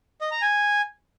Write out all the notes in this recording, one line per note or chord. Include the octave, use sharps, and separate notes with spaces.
D#5
A#5
G#5